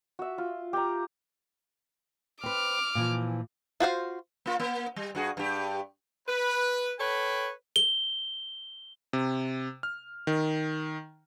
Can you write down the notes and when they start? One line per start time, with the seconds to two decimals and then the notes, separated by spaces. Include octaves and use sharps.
0.19 F#4 E5
0.38 F4
0.73 G4 A#5
2.44 C4 B4 D6 F6
2.95 A#2 E3 F3
3.80 F4 F#4 C5 F5
4.46 A#3 F4
4.60 A#3
4.96 G3
5.15 G2 F#4 G#4
5.37 G2 G4
6.27 B4
6.99 A4 B4 C#5 G5 B5
7.76 G7
9.13 C3
9.83 F6
10.27 D#3